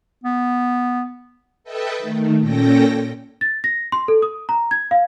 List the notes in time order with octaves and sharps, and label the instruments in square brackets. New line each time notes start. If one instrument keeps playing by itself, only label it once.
[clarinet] B3
[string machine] A4 B4 D#5 E5 G5 A5
D#3 A3
A#2 C#4 A4 G5 A#6
[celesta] A6
A#6
C6
A4
D#6
A#5
G#6
F5